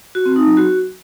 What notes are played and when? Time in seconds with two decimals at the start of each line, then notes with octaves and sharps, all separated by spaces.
0.15 F#4
0.26 C4
0.36 D#4
0.47 F#3
0.57 F#4